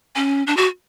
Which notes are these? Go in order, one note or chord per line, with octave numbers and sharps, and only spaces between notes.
C#4
D4
F#4